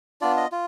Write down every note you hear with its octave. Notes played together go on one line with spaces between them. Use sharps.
B3 D4 F4 D5
D#5
F4